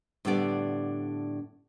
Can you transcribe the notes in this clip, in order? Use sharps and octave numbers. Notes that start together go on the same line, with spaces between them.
A2 D3 G3 B3 D4 D5